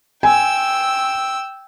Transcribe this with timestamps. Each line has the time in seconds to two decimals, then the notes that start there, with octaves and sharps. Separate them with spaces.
0.23 G5 G#5 E6